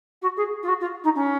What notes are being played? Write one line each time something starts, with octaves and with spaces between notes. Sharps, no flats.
F#4
G#4
F4
F#4
F4
D#4
C#4